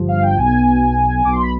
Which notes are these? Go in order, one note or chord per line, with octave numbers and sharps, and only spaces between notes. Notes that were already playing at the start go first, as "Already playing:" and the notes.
Already playing: G1 G2 F3
F5
G5
B1 B2 G#5
B1 B2 D6
C6
B5